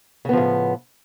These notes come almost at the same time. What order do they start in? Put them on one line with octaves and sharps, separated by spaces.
C#3 B3 F3 A2